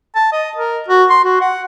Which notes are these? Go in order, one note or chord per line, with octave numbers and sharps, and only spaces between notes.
A5
D#5
A#4
F#4
C6
F#4
F#5